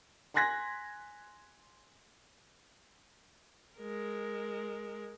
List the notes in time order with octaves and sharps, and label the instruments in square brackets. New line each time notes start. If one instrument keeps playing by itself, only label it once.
[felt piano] G#5 C6 F#6 G#6 A#6 B6
[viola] G#3 A#4